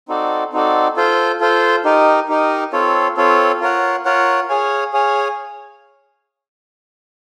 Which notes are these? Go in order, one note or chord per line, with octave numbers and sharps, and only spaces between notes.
C4 D#4 F#4 A4 D5
C4 D#4 F#4 A4 D5
F4 A4 C5
F4 A4 C5
D#4 G4 A#4 D#5
D#4 G4 A#4 D#5
C4 F4 A4 C#5
C4 F4 A4 C#5
F4 A#4 C#5 F#5
F4 A#4 C#5 F#5
G#4 C#5 F5 G#5
G#4 C#5 F5 G#5